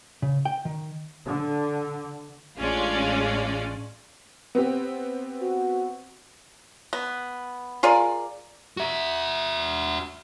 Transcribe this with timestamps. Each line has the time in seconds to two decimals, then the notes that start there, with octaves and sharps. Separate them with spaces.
0.22 C#3
0.45 G5
0.65 D#3
1.24 D3
2.58 A1 G#3 C#4 D4 F4 D5
4.55 B3 C4 G4
5.41 F#4
6.93 B3
7.83 F4 G#4 A#4 D5
8.77 F#4 E5